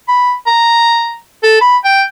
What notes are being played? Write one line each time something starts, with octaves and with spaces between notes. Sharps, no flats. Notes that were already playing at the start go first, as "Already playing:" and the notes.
B5
A#5
A4
B5
G5